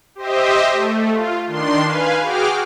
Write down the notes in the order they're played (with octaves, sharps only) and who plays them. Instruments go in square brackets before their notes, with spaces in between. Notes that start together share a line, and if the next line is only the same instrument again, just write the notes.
[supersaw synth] G4 C5 D#5 E5
A3
F4
D#3 D4 C6
B4 F5 G#5
F#4 G#4 G5 D6 F6